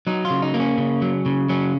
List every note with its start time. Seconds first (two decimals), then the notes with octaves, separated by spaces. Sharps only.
0.07 F#3 D#4
0.25 F4
0.30 C#3
0.42 D#4
0.54 A#3
0.60 C#4
0.78 C#3
1.02 F#3
1.26 C#3
1.49 F#3 C#4